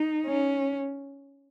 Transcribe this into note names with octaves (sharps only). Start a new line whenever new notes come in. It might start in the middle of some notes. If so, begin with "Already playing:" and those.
Already playing: D#4
C#4